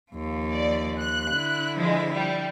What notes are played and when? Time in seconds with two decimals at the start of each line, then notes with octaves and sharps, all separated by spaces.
0.12 D#2 F3
0.52 D5
0.99 F#6
1.32 D3 E4
1.77 F3 G#3
2.13 G3